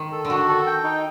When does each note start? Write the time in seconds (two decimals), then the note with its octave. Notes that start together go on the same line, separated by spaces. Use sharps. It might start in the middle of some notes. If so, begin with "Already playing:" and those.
Already playing: D#3
0.12 A4
0.25 D3
0.30 D#3 F#4
0.48 A4
0.66 G5
0.84 D#4